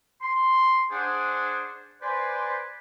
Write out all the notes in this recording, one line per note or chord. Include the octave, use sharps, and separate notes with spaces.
C6
D4 G#4 C5 F#5
B4 C5 D5 G#5